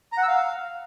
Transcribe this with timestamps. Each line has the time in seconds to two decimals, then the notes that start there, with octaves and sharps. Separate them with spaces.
0.12 A#5
0.18 F#5
0.23 E6
0.28 F5